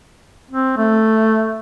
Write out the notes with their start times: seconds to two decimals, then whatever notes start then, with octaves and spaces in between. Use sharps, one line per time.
0.51 C4
0.77 A3